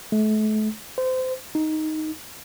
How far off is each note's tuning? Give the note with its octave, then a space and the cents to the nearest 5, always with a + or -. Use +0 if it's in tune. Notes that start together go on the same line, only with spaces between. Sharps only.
A3 -35
C5 -25
D#4 +5